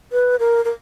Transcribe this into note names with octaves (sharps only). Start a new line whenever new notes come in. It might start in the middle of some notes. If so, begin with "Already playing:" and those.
B4
A#4
A#4